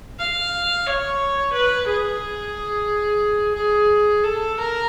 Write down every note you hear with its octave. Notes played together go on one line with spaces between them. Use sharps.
F5
C#5
B4
G#4
G#4
A4
A#4